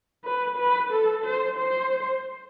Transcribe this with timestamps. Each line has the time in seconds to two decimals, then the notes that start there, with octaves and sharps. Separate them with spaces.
0.24 B4
0.57 B4
0.91 A4
1.25 C5
1.57 C5